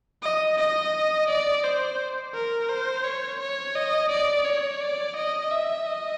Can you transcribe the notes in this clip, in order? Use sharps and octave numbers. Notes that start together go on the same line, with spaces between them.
D#5
D#5
D5
C5
A#4
C5
C#5
C#5
D#5
D5
C#5
D5
D#5
E5
D#5